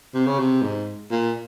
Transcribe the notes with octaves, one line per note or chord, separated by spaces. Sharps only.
C3
C#3
C3
G#2
A#2